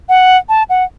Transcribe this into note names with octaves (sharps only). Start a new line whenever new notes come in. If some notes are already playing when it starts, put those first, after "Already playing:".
F#5
A5
F#5